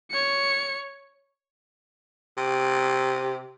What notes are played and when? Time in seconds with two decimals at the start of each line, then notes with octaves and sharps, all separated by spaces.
0.11 C#5 C#7
2.37 C3